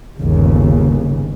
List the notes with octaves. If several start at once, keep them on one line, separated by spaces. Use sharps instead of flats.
G1 D#2 C#3